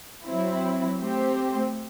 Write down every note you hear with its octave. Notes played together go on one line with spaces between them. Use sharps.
F#3 C4 E4
A3 C4 G4 C5